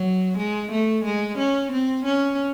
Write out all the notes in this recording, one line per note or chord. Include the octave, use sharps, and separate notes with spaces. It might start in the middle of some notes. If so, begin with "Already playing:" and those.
Already playing: F#3
G#3
A3
G#3
C#4
C4
C#4